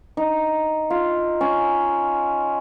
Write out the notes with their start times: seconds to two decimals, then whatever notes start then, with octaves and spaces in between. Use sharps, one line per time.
0.17 D#4
0.90 F4
1.41 C#4